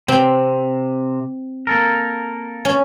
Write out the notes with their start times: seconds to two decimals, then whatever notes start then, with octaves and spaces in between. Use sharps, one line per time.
0.08 C3 C4
1.67 A#3 A4 A#4
2.65 C#4